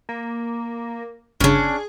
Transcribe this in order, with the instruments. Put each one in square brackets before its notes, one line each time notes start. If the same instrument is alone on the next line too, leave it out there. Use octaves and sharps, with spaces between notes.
[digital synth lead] A#3
[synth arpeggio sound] G1 C#3 [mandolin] C#4 D4 [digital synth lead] G#4